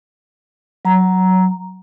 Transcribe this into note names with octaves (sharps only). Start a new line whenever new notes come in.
F#3 A#5